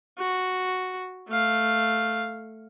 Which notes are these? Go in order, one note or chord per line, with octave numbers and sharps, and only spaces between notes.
F#4
A3 F5